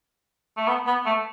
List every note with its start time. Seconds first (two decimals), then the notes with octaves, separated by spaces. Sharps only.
0.57 A3
0.68 B3
0.87 B3
1.06 A3